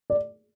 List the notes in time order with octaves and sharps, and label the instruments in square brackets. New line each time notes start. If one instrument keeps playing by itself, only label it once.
[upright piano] D5